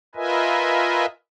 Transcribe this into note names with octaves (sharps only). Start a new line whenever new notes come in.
F4 A#4 B4 D#5 E5 G#5